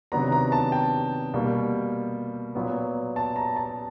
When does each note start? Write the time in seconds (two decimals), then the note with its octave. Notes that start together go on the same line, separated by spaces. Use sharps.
0.12 C3 D#3 F#3 B3 D4 A#5
0.32 A#5
0.52 A5
0.72 G5
1.34 B2 G3 A#3
2.55 A#2 F#3 B3
3.16 A5
3.36 A#5
3.57 A5